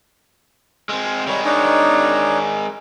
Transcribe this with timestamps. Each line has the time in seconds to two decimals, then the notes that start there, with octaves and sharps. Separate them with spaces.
0.89 G#3 C4
1.27 D#3 G3 G#3 C#5
1.45 D4 D#4 C#5